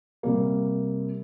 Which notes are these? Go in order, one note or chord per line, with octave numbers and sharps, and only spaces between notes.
C3 G3 A#3